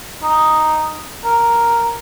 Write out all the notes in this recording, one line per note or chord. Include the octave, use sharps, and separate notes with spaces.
D#4
A#4